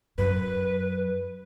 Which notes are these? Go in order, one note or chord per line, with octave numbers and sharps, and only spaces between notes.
F#2 F#3 B4